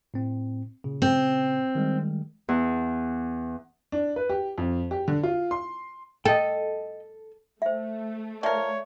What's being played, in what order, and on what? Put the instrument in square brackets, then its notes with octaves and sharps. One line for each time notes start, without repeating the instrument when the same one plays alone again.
[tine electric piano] A2 C4
A#2 C#3
[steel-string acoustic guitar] C4
[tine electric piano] D#3 G3 G#3
[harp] E2
[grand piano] D4
B4
G4
F2
G4
D3
F4
C6
[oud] A4 [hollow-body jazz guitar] D#5 G5
[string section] A3 [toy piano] C5 E5
[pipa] F3 A#4 [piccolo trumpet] C#5 [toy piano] D5 E5